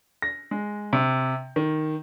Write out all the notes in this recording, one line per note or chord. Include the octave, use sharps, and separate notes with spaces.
A#6
G#3
C3
D#3